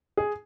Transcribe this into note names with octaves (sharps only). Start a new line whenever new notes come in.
G#4